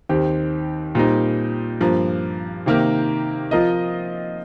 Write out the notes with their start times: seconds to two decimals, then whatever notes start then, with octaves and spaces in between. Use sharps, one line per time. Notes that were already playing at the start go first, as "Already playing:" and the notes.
0.09 D#2 D#3 C4 G4
0.95 A#2 G3 C4 D#4
1.80 G2 F3 A#3
2.66 C3 D#3 A#3 G4 A#4
3.51 F3 C4 F4 A#4 D#5